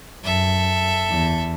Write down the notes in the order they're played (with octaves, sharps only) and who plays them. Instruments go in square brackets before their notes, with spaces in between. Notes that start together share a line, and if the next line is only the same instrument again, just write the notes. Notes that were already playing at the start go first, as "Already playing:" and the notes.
[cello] F#2 [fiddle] A4 E5
[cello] E2